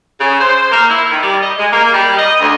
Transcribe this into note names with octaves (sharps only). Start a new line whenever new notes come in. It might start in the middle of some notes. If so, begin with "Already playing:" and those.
C#3
C5
A#3
E4
D#3
G3
D#5
G#3
A#3
G3
D#5
D2